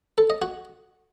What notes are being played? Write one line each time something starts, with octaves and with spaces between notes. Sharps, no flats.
A4
D#5
F#4